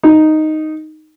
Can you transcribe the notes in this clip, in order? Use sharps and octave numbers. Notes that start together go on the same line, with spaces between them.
D#4